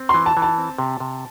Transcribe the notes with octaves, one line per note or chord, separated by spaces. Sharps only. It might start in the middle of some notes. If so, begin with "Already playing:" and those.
Already playing: C4
E3 C6
A5
E3
A5
C4
C3
C3